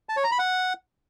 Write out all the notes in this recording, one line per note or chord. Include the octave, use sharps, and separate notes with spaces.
A5
C#5
A#5
B5
F#5